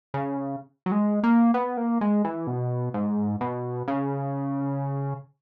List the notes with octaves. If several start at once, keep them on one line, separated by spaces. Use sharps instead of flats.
C#3
F#3
G#3
A#3
B3
A#3
G#3
E3
B2
G#2
B2
C#3